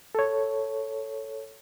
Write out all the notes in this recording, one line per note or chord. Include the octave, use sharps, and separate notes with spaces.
A4 C#5